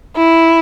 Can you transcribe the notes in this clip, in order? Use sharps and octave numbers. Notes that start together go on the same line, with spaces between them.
E4